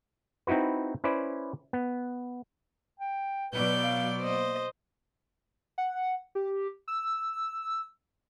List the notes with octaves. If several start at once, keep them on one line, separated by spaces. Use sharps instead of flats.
C4 D#4 E4 F#4 B4
C#4 E4 B4 C5 D5
B3
G5
B2 F#3 B4 D5 G6
F5
A#3 C5 D#5
F#5
G4
E6